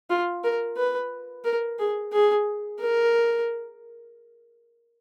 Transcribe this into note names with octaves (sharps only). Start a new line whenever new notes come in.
F4
A#4
B4
A#4
G#4
G#4
A#4